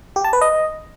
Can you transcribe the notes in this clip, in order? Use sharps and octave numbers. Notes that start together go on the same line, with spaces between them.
G4
A5
B4
D#5